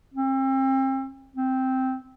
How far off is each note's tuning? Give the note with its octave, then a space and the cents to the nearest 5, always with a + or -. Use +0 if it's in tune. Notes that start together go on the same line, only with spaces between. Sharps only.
C4 +35
C4 -5